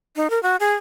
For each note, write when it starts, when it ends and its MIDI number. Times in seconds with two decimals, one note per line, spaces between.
0.16 0.30 63
0.30 0.41 70
0.43 0.56 66
0.60 0.74 68